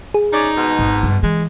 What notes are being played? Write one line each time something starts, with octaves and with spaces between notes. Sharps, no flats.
G#4
C#4 D#4 D5
G#2 B2
G#1
G2
E3 G#3